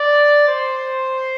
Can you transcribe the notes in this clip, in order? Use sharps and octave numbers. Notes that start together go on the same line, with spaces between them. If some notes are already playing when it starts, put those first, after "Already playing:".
Already playing: D5
C5